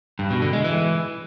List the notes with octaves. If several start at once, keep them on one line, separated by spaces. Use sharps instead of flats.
G2
B2
D3
G#3
E3